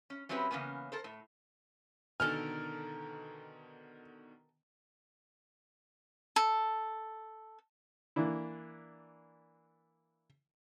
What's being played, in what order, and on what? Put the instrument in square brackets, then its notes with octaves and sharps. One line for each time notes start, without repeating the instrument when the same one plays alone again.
[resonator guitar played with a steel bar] C#4
F#3 C4 C#4 E4 G4 B4
C#3 E3 A#3 B3 C#4
A4 A#4 C5
A2
[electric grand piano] B2 D3 D#3 [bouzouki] A4 A#4 G#5 [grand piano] F6
[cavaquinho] A4
[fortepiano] E3 A#3 D4 E4